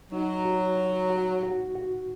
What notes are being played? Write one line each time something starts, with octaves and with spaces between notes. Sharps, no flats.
F#3 D#4
F#4
F#4
F#4
F#4
F#4